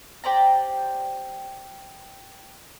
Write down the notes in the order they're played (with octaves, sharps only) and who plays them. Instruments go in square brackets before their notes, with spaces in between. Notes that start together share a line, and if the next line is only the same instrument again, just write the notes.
[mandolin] G4 C5 D5 A#5